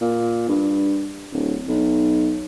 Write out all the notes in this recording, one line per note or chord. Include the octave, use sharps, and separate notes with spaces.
A#2
G2
D1
B1